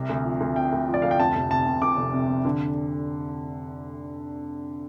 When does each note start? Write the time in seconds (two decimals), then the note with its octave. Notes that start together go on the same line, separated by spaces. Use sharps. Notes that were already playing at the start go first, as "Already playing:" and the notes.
Already playing: C2 C3
0.09 D2
0.24 F3
0.40 D2
0.56 C3 G5
0.72 D2
0.88 F3
0.94 D5
1.02 D2 F5
1.11 G5
1.19 F2 A5
1.35 F1
1.51 C3 A5
1.66 F1
1.82 F2 D6
1.97 F1
2.13 C3
2.29 F1
2.45 D3